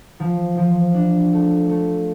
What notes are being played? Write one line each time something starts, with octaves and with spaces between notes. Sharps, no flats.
F3
F3
D4
A3
A3